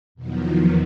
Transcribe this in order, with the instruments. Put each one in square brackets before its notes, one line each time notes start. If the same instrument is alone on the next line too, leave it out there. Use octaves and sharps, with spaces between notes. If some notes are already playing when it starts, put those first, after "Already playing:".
[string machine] E2 B2 D#3 F3 F#3